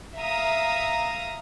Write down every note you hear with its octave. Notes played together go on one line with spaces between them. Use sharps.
E5 F5 A#5 D#6